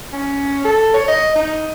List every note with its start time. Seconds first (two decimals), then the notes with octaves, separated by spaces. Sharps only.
0.13 C#4
0.65 A4
0.94 C#5
1.08 D#5
1.36 D#4